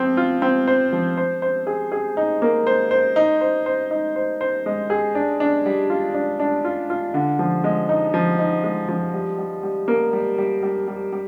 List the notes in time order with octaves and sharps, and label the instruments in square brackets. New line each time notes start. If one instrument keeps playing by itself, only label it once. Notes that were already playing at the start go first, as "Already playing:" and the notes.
Already playing: [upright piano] F3 C4
F4
C4
C5
F3
C5
C5
G#4
G#4
D#4
A#3
C5
C5
D#4
C5
C5
D#4
C5
C5
G#3
G#4
D4
D4
G3
F4
D4
D4
F4
F4
D3
F3
G#3
D#4
F3
D#4
G#3
F3
G3
G3
G3
A#3
G3
G3
G3
G3
G3